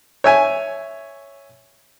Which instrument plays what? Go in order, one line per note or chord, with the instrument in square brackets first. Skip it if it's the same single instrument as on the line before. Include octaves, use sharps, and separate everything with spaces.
[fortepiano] C#5 E5 G#5